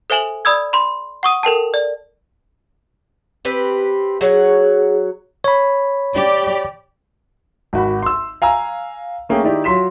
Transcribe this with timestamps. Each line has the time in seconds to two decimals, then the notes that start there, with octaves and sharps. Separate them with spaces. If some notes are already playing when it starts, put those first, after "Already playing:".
0.10 A4 C5 E5 G#5 E7 F#7
0.45 D5 B5 D#6 E6 G#6
0.73 B5 C6
1.23 F#5 C#6 D#6 D#7
1.43 A4 A#4 G5 A5
1.74 D5
3.45 C4 G4 B4
4.21 F#3 G#4 C#5 F#5
5.44 C#5 B5
6.14 G4 D5
7.73 G#1 F#4 B5
8.03 C6 E6
8.42 F5 G#5 A#5 E6
9.29 A3 A#3 C#4 G#4 G5
9.43 D#3 D#4 E4 G4 D5
9.64 F#3 F4 C6 B6 E7